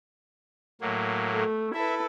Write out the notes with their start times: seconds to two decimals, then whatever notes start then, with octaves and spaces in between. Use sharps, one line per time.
0.81 A2 F#3 A#3
1.33 A3
1.74 E4 A4 B4 E5